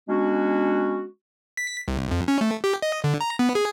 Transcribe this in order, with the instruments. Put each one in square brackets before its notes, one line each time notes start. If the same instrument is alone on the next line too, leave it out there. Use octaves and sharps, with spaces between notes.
[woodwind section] G#3 B3 C#4 D4 F#4
[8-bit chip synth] B6
C2
F2
C#4
A3
G4
D#5
D3
A#5
B3
G#4